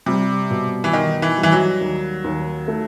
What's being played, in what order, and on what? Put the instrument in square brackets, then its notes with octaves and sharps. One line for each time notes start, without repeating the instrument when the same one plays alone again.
[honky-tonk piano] C3 [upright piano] G3
[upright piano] B2
[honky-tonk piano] E3
[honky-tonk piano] D#3 [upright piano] D#4
[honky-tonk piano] E3
[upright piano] G3
[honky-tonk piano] E3
F#3
[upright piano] D#2
D#2
A3